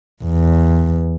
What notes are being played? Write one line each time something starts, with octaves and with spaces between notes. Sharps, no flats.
E2